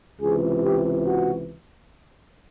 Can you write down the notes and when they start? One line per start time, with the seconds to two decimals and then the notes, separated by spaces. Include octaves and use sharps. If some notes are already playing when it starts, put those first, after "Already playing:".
0.20 C#2 C3 E3 G#4
0.64 G4
1.06 F#4